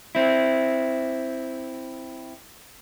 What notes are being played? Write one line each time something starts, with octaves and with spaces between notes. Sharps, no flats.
C4 E4